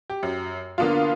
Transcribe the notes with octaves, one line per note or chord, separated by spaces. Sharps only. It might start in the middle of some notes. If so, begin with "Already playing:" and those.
G4
F#2
D3 A#3 B3 D4 F4